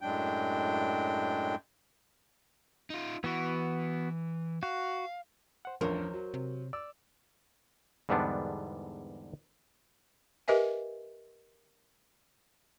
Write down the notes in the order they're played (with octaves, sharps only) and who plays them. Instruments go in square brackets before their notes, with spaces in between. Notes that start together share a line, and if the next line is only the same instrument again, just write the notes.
[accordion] F#2 A2 F#3 G#3 D4 G5
[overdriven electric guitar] D#4 F4
[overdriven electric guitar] E3 [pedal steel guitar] B3 F#4
[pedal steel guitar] F#4 [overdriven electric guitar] F5
[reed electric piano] C5 F#5
[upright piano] A1 E2 G2 [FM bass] F3 [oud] A#4 [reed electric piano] C5 C#5 G6
[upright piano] F#3
[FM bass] C3
[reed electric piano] D5 [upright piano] E6
[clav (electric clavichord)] E2 G#2 D3 G3 B3 D4
[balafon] G4 A#4 B4 D#5 E5 G#5